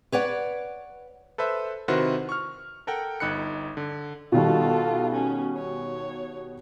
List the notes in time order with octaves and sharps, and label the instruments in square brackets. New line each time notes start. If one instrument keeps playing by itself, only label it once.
[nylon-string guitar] B4 C#5 D5 F#5
[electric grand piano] A4 B4 C5 E5
C3 D#3 E4 F#4 B4 C5
C#6 F6
A4 A#4 F#5 G5
G1 D#4 B5 F#6 C#7
D3
[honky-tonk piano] B2 D#3 G3 [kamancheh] F4 A4
[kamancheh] C#4
C#5